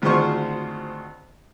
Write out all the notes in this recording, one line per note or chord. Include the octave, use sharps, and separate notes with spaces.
G#1 D2 F4 G#4 C5 C#6